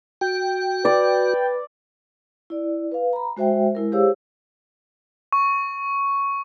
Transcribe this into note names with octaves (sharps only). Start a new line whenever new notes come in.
F#4 G5
B4 D5
E4 D5
B4 F5
A#5 B5
G#3 F#4 C5 E5 G5
G#3 E4 A#4
G4 G#4 C5 C#5 F5 E6
C#6